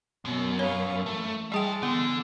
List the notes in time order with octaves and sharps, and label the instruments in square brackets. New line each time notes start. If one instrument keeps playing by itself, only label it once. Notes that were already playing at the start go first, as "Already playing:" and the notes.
[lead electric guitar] F#2 [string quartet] B2
[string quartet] B4 F5 C#6 [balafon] C#5
[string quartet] E3 [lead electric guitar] A3
[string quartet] E3 G#3 [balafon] G3 G#4 G5 [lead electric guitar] E5 A5
[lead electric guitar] D3 [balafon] B3